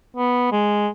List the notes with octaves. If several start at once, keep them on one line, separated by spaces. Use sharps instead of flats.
B3
G#3